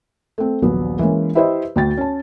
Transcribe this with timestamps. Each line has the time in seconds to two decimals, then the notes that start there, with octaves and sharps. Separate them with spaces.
0.38 A3 C4
0.62 D#1 A#1 F#3 B3
0.99 E3 G#3 A#3 C#4
1.35 E4 G4 B4 C5 D#5 E5
1.76 D2 G5 A6
1.97 C#4 A5